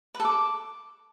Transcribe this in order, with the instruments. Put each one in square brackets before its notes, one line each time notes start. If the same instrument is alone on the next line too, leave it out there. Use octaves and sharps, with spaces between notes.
[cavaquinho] B4
A4
D6